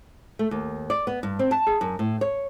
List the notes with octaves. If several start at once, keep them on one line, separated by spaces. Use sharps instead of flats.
A3
D#2
D5
B3
G2
C4
A5
G#4
F#2
A2
C#5